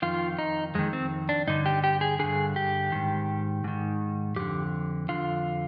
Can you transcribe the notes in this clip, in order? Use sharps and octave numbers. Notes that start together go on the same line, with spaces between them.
F2 D#3 F4
D#4
F2 D#3 G#3
C4
D4
G2 D3 D#4
G4
G4
G#4
G2 D3 G#4
G4
G#2 D#3
G#2 D#3
F2 D3 G4
F2 D3 F4